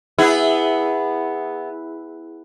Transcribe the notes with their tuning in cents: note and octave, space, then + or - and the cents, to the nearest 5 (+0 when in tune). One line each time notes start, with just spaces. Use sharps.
B3 +0 E4 -10 G#4 -20